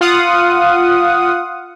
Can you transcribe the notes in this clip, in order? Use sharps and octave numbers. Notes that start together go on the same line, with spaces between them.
F4 F5 F#5 D#6